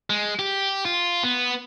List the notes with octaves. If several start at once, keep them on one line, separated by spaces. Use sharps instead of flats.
G#3
G4
F4
B3